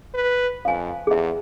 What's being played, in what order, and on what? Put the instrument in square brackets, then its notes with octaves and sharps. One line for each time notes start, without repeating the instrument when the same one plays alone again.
[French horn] B4
[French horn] F2 [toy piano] F5 G#5
[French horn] E2 [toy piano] G#4 E5